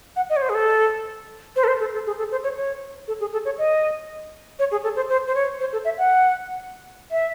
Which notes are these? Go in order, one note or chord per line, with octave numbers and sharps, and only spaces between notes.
F#5
D#5
C#5
C5
G#4
A4
C5
A4
C5
A4
A4
G#4
A4
C5
C#5
C#5
A4
G#4
A4
C#5
D#5
C#5
G#4
A4
C5
C5
C5
C#5
C5
A4
E5
F#5
E5